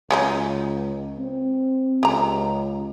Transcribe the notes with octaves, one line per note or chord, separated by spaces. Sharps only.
C#2 F#3 C#4 D#4
C4
C#2 G4 A#5